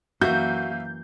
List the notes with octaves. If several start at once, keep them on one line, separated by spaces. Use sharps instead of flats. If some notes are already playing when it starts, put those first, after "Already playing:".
F#2 E3 A#3 F#4 E5 F5 G6